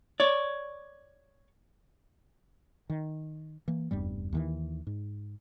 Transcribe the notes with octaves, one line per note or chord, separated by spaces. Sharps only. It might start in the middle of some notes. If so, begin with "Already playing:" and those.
C#5 D5
D#3
E3 A#3
F1 E2 G2 G3
D#2 D#3 E3
G#2